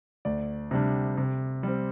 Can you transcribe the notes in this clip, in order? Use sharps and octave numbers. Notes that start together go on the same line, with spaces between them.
D2 D5
C3 G3 D4
C3
G3 C4